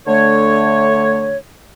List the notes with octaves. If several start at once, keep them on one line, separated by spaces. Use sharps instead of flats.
D3 A3 C#5